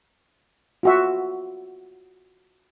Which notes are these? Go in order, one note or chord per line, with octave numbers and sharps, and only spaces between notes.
F4 F#4 E5